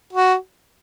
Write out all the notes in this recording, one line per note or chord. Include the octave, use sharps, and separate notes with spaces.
F#4